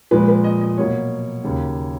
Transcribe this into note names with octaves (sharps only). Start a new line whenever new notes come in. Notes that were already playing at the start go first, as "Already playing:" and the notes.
A#2 F3 G#3 B4
B4
D#5
D#5
B2 F#3 A#3 C#5
D#2 C#3 F#3 A#3